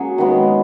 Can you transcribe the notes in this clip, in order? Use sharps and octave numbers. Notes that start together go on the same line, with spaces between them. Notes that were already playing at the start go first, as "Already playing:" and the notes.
Already playing: F#3 A#3 C#4 G#4
D#3 G#3 B3